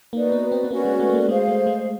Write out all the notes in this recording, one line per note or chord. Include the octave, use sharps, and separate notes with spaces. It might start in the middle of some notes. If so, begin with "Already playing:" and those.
A#3 D#4 F#4 B4 D5
B3
C4
B3
A#3 C#4 F#4 B4 D5
G#3
A3
A#3
A3
G#3 G#4 C5 F5
A3
G#3